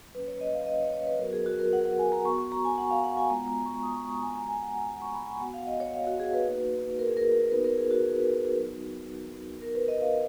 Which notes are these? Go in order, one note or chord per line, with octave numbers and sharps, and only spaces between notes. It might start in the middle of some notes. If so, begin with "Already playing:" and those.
F#3 A#3 C#4 B4
C#5
D#5
F5
D#5
C#5
C#5
B4
F#3 B3 F#4 A#4
G#4
F#4
A#4
F#5
F#5
G#5
A#5
B3 F#4 C#6
C#6
A#5
G#5
F#5
F5
F#5
G#5
G#3 B3 F4 A#5
A#5
C#6
D#6
C#6
A#5
G#5
G#3 B3 F#4 A#5
G#5
F#5
F#5
G#5
C#6
B5
G#5
B3 F#4 F#5
F5
D#5
C#5
F5
F#4
G#4
B4
A#3 D#4 F#4
A#4
G#4
A#4
B3 D#4 F#4 B4
A#4
G#4
F#4
G#4
B4
F#3 B3 D#4 F#4
B3 D#4 F#4 A#4
B4
D#5
F5